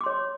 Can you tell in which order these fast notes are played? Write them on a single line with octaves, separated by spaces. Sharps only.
D6 C6 C#5